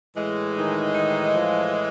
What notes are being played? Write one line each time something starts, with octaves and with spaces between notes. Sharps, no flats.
A2 E3 G#3
D#3 D#4
D#3 D#4
F3 F4